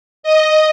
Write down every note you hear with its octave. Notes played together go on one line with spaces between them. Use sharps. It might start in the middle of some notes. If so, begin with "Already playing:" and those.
D#5